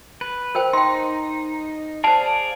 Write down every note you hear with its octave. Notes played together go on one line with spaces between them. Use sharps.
B4
A#4 C5 G5
D#4 G5 C6
G#4 C5 D5 F5 A5